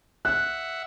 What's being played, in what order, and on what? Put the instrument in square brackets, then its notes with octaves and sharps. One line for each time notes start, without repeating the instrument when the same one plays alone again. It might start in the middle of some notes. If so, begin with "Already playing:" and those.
[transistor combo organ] E5 F#5 [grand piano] F#6